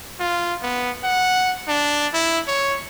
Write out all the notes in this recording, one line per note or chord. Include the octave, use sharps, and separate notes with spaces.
F4
B3
F#5
D4
E4
C#5